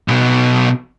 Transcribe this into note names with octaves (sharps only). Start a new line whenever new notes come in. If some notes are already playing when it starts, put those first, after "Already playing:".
B1 B2